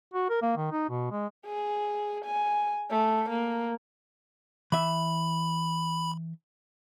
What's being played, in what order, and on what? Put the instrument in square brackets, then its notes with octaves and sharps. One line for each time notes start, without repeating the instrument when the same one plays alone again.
[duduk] F#4
A#4
A#3
D#3
D#4
B2
G#3
[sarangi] G#4
G#5
A3
A#3
[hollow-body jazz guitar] E3 E5 [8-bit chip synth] B5